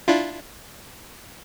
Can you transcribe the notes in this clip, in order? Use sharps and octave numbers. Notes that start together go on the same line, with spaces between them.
D4 E4 F4